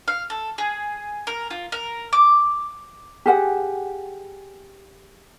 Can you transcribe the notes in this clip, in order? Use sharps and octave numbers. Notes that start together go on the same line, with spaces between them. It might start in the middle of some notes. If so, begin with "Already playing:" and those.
F5
A4
G#4
A#4
F4
A#4
D6
G4 G#4 F#5